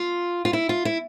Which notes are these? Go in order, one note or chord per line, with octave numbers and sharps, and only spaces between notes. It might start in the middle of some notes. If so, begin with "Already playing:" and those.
Already playing: F4
F4
E4
F4
E4